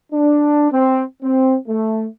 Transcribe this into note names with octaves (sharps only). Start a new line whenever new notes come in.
D4
C4
C4
A3